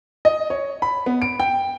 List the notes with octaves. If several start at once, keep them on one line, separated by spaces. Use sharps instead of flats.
D#5
C#5
B5
B3
D7
G5